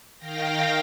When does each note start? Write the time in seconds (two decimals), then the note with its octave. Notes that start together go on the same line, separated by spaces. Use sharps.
0.18 D#3 F5 G5 A#6